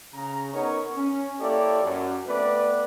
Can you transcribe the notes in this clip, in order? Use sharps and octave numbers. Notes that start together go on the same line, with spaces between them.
C#3 A#5
B3 C#4 D#4 A#4 C#5
C#4
A#3 E4 G4 A4 C#5 D5
F#2
A3 B3 C4 B4 D5